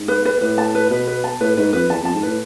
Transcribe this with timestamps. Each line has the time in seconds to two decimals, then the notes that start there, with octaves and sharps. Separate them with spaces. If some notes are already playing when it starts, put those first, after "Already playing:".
Already playing: G#2
0.08 B4
0.25 B4
0.41 A2 B4
0.58 A5
0.75 B4
0.90 B2 B4
1.07 B4
1.24 A5
1.40 A2 B4
1.57 G#2 B4
1.73 F2 B4
1.90 E2 A5
2.02 F2 A5
2.14 G#2
2.23 A2 B4